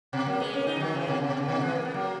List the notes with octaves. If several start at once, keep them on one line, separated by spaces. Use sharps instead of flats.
B2
F#3 A#3
G#3 B3
A#3 C#4
B3 D#4
E3
D#3 F#3
C#3 E3
B2 D#3
C#3
B2
C#3
B2 D#3
E3 G#3
A#3
B3
F#3 A#3